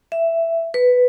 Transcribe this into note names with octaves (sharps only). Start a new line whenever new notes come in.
E5
B4